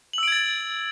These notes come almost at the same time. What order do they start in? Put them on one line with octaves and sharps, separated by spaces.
F#7 E6 D7 G#6 A6